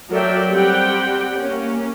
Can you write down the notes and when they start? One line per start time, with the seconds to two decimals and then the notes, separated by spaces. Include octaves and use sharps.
0.11 F#3 A4 A#4 D5 E5 G5
0.48 G3 C4 G4 F#5 G5
1.35 A#3 C#4